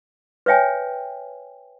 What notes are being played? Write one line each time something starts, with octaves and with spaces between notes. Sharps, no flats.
B4 C#5 E5 G5 G#5